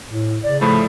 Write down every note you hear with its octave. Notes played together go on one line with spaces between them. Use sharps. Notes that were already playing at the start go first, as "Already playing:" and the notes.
A2
C#3 D5
A2 F3 A3 B5